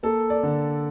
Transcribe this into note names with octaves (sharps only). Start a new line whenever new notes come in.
A#3 A4
D5
D3